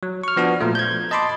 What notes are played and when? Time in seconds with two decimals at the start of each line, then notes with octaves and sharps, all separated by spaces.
0.03 F#3
0.24 C#6 F6
0.37 F3 B3 D4 F#4
0.60 A#2 F3 A3
0.75 G6 G#6
1.11 D#5 A5 B5 C6 D6